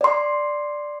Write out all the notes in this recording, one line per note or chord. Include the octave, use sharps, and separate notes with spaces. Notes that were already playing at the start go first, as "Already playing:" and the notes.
D5 C6